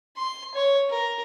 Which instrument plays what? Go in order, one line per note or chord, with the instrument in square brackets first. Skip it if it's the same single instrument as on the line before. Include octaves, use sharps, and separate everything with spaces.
[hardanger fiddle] C6
C#5
A#4